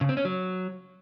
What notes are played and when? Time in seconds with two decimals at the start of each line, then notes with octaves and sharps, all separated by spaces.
0.01 C#3
0.09 C4
0.17 C#4
0.25 F#3